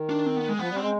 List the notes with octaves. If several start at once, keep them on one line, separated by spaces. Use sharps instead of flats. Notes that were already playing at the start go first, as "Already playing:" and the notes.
Already playing: D#3
D4
C4
B3
G#3
F3 B3
G3
C4
G#3